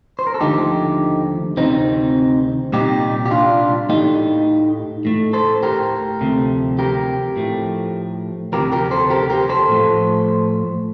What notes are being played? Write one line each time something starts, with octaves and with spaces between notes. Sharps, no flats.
C5
A#4
A4
D#2 D3 F3 A3 D#4 G4
D2 C3 D#3 C4 D#4
C2 A#2 G3 D#4 G4
G4
D4 F4
A2 A3 D#4 G4
A2 A3
A4 C5
G4 A#4
D2 C3 F3 A3
G4 A#4
A2 F3 A3
D2 C3 F3 G4 A#4
G4 A#4
A4 C5
G4 A#4
G4 A#4
A4 C5
A2 F3 A3